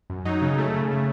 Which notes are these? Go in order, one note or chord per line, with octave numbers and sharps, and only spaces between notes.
F#2
F#3 D#4
C#3
A3
C#3
A3